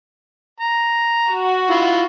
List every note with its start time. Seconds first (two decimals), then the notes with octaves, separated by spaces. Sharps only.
0.60 A#5
1.28 F#4
1.71 E4 F4